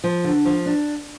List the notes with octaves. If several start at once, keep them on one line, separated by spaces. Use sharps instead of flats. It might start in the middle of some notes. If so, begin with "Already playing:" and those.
F3
D3
F3
D4